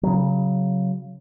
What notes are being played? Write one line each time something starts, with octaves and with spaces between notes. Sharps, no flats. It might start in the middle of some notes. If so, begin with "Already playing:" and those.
C#3 F#3